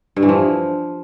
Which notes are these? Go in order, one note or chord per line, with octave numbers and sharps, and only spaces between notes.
G2
E3
F3